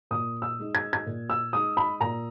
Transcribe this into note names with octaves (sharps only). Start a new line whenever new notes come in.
A#2 D#6
E6
G#3 D#4
G#6
G#6
A#2
E6
G#3 D#4 D#6
B5
A#2 A#5